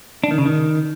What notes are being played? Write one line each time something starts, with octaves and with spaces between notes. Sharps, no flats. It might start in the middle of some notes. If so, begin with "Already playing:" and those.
D4
D#3
C#3
D#3